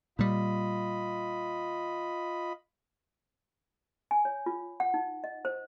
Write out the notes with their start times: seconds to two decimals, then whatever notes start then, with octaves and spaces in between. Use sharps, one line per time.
0.19 A#2 G3 F4 D#5 B5
4.11 G#5
4.25 C#5
4.46 F4
4.80 F#5
4.94 D#4
5.24 D#5
5.45 C5